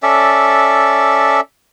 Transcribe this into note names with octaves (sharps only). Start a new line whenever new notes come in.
C#4 A4 D5 E5